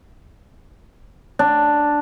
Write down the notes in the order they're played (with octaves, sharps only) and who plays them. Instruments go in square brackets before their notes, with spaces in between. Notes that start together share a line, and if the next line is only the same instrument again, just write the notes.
[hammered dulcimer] D4